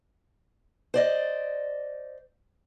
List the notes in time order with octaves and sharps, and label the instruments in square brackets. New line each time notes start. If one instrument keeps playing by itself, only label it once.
[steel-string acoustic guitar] C5 D5 D#5